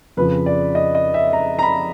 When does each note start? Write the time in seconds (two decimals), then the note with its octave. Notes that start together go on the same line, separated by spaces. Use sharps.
0.17 F2 C#3 F3 B4
0.46 D5
0.75 D#5
0.95 D#5
1.14 E5
1.33 A#5
1.59 A#5
1.63 B5